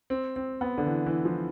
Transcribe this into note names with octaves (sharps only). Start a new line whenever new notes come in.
C4
C4
B3
D3
E3
E3
F3